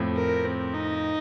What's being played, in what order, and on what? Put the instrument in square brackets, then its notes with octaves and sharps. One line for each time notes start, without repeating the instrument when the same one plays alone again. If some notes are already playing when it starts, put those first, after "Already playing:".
Already playing: [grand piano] F2 A2
[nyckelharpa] A#4
C4
D#4